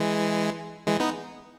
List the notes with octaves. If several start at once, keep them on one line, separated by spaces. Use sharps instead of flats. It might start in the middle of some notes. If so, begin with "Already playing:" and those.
Already playing: E3 G#3
E3 G#3
B3 D#4